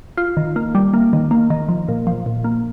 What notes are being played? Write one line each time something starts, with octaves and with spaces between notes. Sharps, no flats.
F4
D#3
A#3
G3
A#3
D#3
A#3
D#3
F3
A#2
F3
A#2
A#3